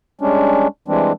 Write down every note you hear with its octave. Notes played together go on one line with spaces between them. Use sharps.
G3 G#3 C#4 D4
E3 G3 G#3 C4 D4